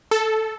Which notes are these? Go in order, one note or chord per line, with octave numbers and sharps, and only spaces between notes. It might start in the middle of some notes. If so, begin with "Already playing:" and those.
A4